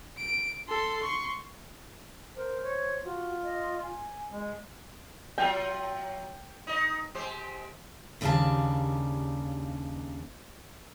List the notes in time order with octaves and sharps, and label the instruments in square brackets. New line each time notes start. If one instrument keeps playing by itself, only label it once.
[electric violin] D7
A4 C6
C6 C#6
[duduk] A#4 [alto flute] C5
[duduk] C#5
[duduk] F4 [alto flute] F#4
[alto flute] D#5
G#5
[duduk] G#3
[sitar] F#3 F4 E5 [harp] G5
[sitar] D#4 D#5
G#3 G4 C5
[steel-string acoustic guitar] D#2 C#3 G3 D4 F5 A5